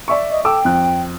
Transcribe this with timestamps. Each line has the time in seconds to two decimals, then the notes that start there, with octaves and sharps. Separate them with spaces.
0.08 D5 E5 C#6
0.31 D#5
0.45 A4 G5 D6 E6
0.65 F2 F#6